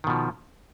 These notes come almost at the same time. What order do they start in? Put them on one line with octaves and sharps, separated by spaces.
D#3 B2 F3